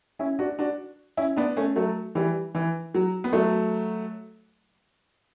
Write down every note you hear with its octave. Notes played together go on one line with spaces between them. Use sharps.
C#4 E4
D4 F#4
D4 F#4
C#4 E4
B3 D4
A3 C#4
F#3 A3
E3 G3
E3
F#3
B3
F#3 A3